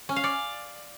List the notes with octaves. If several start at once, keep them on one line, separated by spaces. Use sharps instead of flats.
C#4
F5
D5